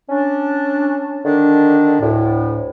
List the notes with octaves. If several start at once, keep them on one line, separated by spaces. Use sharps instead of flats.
C#4 D4
D3 D#3 D4
D2 A2